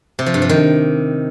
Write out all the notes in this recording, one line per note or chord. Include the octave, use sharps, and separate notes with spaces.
C3
F3
G2
F3
D#3